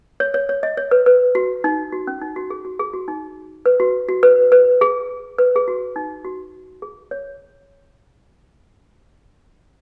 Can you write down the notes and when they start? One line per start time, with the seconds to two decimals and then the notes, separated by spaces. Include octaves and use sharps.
0.20 C#5
0.34 C#5
0.49 C#5
0.63 D#5
0.77 C#5
0.91 B4
1.06 B4
1.35 F#4
1.64 D#4
1.92 F#4
2.07 C#4
2.22 D#4
2.36 F#4
2.50 G#4
2.65 F#4
2.79 G#4
2.93 F#4
3.08 D#4
3.66 B4
3.80 F#4
4.09 F#4
4.23 B4
4.52 B4
4.81 G#4
5.38 B4
5.56 G#4
5.68 F#4
5.96 D#4
6.25 F#4
6.82 G#4
7.11 C#5